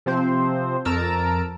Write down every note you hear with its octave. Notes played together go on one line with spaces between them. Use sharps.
C3 F3 C4 C5
F2 A#4 A5 A#5 E6 D7